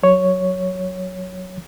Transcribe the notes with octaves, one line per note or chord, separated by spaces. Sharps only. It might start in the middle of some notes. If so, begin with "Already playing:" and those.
F#3 C#5